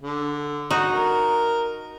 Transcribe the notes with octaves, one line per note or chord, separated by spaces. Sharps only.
D3
D#4 F#4
A#4